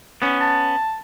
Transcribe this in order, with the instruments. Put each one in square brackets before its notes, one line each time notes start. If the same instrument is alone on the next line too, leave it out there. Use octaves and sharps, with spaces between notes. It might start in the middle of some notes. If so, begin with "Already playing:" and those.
[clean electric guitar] B3 C#4
[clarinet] A5